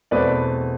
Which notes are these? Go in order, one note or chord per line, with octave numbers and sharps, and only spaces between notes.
E2 B2 A3 C4 B4 D5